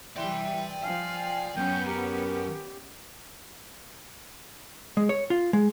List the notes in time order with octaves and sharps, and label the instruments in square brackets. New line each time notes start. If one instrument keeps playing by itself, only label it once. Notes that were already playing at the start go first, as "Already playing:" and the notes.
[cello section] E3 G3 [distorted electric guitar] D5 C6 [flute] E5 [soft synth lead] G5
[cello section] F3 F5 [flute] G#5
[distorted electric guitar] F#2 [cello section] B3 C#4 [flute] G6
[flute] G4 [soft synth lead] A#4
[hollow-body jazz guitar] G#3
C#5
F4
G#3